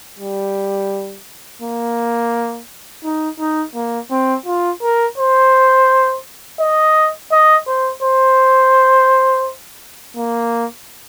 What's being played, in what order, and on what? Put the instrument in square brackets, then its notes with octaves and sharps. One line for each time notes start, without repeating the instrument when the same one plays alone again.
[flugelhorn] G3
A#3
D#4
D#4
A#3
C4
F4
A#4
C5
D#5
D#5
C5
C5
A#3